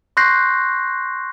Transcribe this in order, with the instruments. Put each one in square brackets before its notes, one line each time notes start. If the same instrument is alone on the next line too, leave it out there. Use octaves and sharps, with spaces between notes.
[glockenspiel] C6 C#6 F#6 G6 A#6 C7